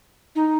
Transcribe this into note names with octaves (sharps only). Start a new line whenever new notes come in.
D#4